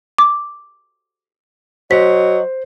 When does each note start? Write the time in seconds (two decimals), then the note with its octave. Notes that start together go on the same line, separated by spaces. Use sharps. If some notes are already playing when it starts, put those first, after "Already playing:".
0.18 D6
1.91 F#3 C5 D#5 B6